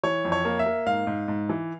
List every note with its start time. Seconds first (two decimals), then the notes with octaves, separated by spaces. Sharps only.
0.03 E3 C#5
0.25 F2
0.32 C#5
0.45 A#3
0.59 E5
0.66 A#3
0.86 G#2 F5
1.07 G#2
1.28 G#2
1.49 E3